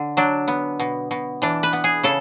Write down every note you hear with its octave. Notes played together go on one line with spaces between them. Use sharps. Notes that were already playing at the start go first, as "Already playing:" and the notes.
Already playing: D3
F#3 D4
B3
B2
B2
E3 D4
B4
B3
G#4
C#3 A4